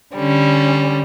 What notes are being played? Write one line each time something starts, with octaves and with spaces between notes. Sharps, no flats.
D3 G3 C#4